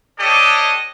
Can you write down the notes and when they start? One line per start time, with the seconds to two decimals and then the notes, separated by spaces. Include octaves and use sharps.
0.19 D4 G4 A4 C#5 D#5